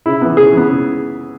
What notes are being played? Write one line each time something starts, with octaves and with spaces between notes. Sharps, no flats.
C#3 E4
E3 B3
C#3 G#4
E3 B3
C#3